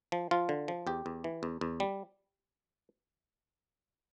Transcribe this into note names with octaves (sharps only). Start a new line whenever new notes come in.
F3
F3 F4
D3
F3
E2 G4
E2
E3
E2
E2
G3